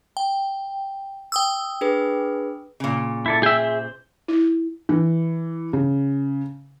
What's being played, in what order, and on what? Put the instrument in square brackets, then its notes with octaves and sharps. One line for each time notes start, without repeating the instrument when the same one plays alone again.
[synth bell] G5
G5 D#6 E6
[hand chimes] D4 G#4 B4
[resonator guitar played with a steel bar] A#2 C#3
[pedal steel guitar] E4 A4 D5
[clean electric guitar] G#4 E5 [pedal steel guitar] G5 E6
[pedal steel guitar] C5
[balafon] E4
[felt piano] E3
C#3